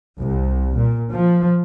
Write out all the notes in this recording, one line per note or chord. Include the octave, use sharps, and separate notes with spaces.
C2
A#2
F3